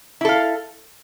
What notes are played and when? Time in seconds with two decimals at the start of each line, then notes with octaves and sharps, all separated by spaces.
0.21 E4
0.25 A4
0.29 F5